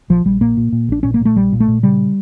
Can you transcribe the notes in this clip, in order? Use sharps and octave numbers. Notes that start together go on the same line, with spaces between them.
A#1 F3
A#1 G3
A#2 A#3
A#2
A#2
A#1 D4
A#2 C#4
A#3
A#2 A3
A#1 G3
A#2
A3
A#2
C#3 G3